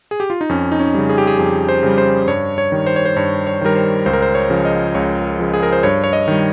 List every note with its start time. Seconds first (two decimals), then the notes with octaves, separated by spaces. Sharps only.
0.11 G#4
0.20 G4
0.30 F4
0.41 D#4
0.49 F2 C#4
0.72 D#4
0.79 C#4
0.94 C#3 G3
1.09 G#4
1.18 G4
1.27 G#4
1.39 F2 G#4
1.69 C5
1.83 C#3 G3
1.98 C5
2.28 G2 C#5
2.58 C#5
2.72 D#3 G3
2.86 C5
2.96 C#5
3.05 C5
3.16 G2 C#5
3.47 C#5
3.61 D#3 G3 A#4
3.75 C5
4.06 C#2 C5
4.13 A#4
4.22 C5
4.35 C#5
4.50 C#3 F3
4.65 D#5
4.95 C#2 C#5
5.39 C#3 F3
5.53 G#4
5.63 A#4
5.73 C5
5.83 G2 C#5
6.04 C#5
6.13 D#5
6.28 D#3 G3